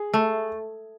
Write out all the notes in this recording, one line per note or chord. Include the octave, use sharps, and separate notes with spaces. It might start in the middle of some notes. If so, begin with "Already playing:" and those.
Already playing: G#4
A3